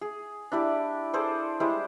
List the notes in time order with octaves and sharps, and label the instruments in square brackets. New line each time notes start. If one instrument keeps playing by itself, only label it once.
[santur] G#4
D4 E4 G4 D5
G#4 A4 C5 D5
G3 G#3 E4 C5